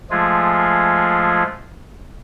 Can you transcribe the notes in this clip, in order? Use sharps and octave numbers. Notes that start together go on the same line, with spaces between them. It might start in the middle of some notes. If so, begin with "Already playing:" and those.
F3 G#3 A3 F4 G#4